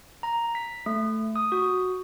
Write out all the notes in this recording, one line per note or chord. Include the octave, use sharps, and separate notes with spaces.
A#5
B6
A3
D#6
F#4